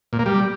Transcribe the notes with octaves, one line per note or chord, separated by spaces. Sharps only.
A#2
A#3
G3